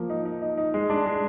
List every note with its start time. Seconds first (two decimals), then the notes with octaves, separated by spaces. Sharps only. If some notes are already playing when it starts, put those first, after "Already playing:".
Already playing: F3 A#3
0.10 D#4
0.25 D#4
0.42 D#4
0.57 D#4
0.74 G#3
0.90 D4
1.06 G#3